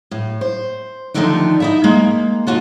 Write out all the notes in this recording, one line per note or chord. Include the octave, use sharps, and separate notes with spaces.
A2
C5
D3 D#3 F3 A3 D4 D#4
D#4 E4 E5
G#3 A#3
D#3 F4 F#4 A4